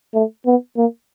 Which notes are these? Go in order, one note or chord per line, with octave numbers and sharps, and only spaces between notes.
A3
B3
A#3